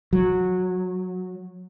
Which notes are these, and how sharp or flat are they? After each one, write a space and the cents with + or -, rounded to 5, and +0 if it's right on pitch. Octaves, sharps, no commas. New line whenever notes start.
F#3 -15